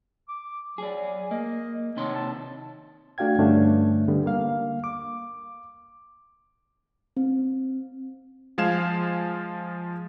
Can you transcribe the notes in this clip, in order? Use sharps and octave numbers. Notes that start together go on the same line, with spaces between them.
D6
F#3 G#4 D5
A#3 D#5
C3 D#3 C#5 C6
A5
A3 D4 F#4 F5 G5 G#6
G2 D3 A3 C#4 D4
D3 G3 B3
A#3 F5
D6
C4
F3 G#3 F5 G#6 E7